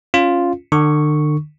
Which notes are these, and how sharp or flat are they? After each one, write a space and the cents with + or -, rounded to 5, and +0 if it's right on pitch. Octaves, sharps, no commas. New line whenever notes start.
C#4 +0 F4 +0
D3 +40 C#6 +0